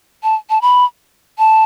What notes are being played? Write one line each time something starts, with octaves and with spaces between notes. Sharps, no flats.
A5
A5
B5
A5